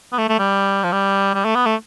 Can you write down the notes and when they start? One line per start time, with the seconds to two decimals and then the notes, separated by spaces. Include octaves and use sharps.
0.12 B3
0.18 A3
0.29 A3
0.39 G3
0.83 F3
0.92 G3
1.34 G3
1.45 A3
1.55 B3
1.66 A3